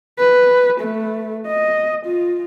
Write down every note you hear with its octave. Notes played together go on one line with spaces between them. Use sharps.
B4
A3
D#5
F4